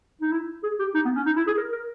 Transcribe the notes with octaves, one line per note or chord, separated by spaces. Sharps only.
D#4
E4
G#4
G4
D#4
B3
C#4
D#4
E4
G#4
A#4
A#4